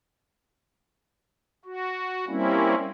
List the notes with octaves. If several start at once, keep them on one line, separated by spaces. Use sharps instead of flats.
F#4
G3 A#3 C4 C#4 E4